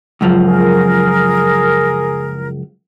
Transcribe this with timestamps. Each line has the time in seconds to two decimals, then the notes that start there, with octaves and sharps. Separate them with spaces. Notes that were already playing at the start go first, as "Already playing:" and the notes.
0.21 C#2 F#2 F3
0.45 G#4 A#4